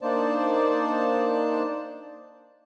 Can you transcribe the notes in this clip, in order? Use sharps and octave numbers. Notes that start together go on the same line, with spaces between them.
A#3 D4 D#4 C5 D5 A5